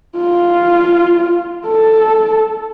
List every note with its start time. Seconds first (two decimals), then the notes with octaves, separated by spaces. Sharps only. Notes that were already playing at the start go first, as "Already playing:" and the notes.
0.17 F4
1.67 A4